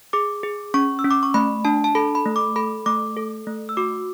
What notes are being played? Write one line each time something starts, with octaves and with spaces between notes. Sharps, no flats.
G#4 D6
G#4
C#4 C#6
E6
C#4
D6
C#6
A3 B5
D4 A5
A5
A4 B5
B5
A3
D6
A4 B5
A3 D6
A4
A3
E6
F#4 D6